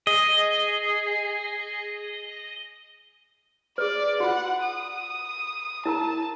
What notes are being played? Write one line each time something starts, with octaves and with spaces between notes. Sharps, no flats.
G#4 D#5
G#4 B4 D5
F4 F#4 F#5
D#6
E4 A#4 A5 A#5